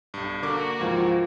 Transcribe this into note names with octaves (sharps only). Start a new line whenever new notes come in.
B1 G2
D3 A#3 F#4 A#4 D6
C#2 G#2 E3 F3